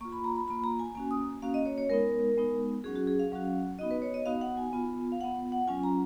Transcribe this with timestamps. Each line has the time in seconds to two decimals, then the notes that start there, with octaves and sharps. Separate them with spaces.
0.01 A#3 C#6
0.05 F4
0.12 B5
0.24 A#5
0.36 B5
0.47 A#3 F4 B5
0.64 A#5
0.79 G#5
0.95 A#3 C#4 F#4 G#5
1.11 D#6
1.42 A#3 C#4 F#4 F5
1.54 D#5
1.66 C#5
1.78 C#5
1.90 G#3 B3 D#4 A#4
2.37 G#3 B3 D#4
2.84 F#3 C#4 F#4 G#4
2.95 F#4
3.07 G#4
3.19 F5
3.32 F#3 C#4 F#4
3.79 B3 D#4 F#4 D#5
3.91 B4
4.02 C#5
4.14 D#5
4.26 B3 D#4 F#4 F5
4.41 F#5
4.57 G#5
4.73 B3 F4
5.12 F5
5.21 B3 F4 F#5
5.52 F#5
5.68 F#3 C#4 F4 G#5
5.83 A#5